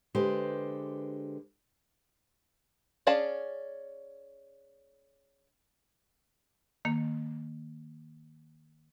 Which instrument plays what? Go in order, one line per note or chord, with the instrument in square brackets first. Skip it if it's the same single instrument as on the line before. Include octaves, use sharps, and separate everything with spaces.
[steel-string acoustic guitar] D3 G#3 G4 B4 C5
[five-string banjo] C#4 G#4 D5 F5 A5
[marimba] D#3 A#3